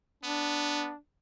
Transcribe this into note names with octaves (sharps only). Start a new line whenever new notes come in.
B3 D4